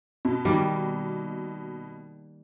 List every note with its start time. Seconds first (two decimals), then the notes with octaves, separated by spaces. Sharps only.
0.25 B2
0.45 D#3 G3 A#3